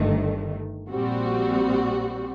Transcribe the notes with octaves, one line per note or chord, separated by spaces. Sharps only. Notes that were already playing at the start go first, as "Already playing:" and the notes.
Already playing: G1 G2 D#3 A3
A#1 A#2 G3 C4 F#4